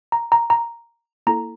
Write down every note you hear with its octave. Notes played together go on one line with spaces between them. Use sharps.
A#5
A#5
A#5
A#3 E4 A4 A#5